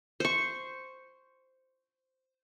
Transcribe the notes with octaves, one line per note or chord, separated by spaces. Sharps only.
C5 C#6